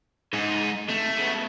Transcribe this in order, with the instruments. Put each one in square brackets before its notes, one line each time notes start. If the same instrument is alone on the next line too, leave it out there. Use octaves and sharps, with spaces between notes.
[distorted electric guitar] G#2 [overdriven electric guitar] C#3 D#4
[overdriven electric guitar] C3 A5 [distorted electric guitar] A3
[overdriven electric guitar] C#3 B3